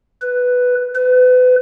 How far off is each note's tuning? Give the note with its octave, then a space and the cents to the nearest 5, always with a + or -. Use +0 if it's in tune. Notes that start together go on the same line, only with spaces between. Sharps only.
B4 +5
B4 +35